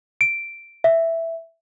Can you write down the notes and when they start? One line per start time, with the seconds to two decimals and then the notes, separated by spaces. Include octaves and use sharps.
0.21 D7
0.84 E5